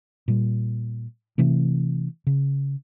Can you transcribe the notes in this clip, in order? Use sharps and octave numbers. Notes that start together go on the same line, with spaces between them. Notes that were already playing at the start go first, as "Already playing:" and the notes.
A#2 G3
C3 E3 A3
C#3